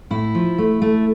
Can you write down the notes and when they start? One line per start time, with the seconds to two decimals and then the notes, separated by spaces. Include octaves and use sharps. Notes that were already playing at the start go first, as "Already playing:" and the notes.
0.10 A2 E4
0.35 F3
0.58 A3
0.82 A3